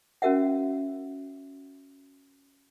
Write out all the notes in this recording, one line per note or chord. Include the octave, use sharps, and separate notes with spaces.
C#4 F#4 A#4 E5 F#5